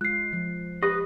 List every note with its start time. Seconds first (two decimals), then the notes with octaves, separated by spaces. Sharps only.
0.01 G#3 F4 F#6 C7
0.33 F3
0.83 G4 B4 D#5